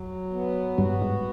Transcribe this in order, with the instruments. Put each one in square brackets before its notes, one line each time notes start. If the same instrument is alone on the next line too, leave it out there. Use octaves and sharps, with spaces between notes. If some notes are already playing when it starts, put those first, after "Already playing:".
Already playing: [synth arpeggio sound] F2 [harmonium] F#3
[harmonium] B3
[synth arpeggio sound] G2 G3 [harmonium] F#4
[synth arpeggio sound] G#2 G#3